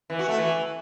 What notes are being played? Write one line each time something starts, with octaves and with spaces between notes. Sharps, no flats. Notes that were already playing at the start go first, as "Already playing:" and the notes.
E3
F#4
A3
E3